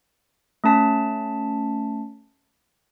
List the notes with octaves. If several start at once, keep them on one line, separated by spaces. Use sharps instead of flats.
A3 C#4 A5 B6